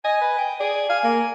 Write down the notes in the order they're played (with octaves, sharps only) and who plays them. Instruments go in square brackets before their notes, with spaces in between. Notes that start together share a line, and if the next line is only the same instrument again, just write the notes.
[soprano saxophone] D#5 [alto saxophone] G#5
[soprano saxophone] B4
G5
[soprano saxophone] G#4 [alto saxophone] D5
[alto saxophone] F5 [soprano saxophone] G#5
[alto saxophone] A#3